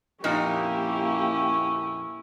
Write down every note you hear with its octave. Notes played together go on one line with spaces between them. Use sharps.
F2 A#2 A#3 C#4 D#4 E4 G4